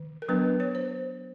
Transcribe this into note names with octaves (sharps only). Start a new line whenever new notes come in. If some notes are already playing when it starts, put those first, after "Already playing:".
Already playing: D#3
A#4
F#3 B3 D4 B4
C#5
C5